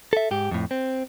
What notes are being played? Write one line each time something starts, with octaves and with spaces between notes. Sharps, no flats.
A4 E5
G#2 G4
F2 A2
C4